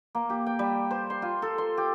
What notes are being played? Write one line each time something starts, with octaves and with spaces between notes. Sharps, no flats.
A#3
G4
G5
G3
C5
C6
F4
A4
C6
G4